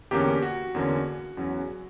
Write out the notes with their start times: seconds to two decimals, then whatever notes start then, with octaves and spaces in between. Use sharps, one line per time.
0.11 E2 D3 A#3 C#4 G4
0.42 F#4
0.75 E2 D3 A#3 C#4
1.37 E2 C#3 F#3 C#4